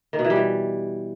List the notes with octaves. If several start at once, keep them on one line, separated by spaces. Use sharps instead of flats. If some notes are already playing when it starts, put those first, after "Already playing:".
D#3
B2
E3
G3
E3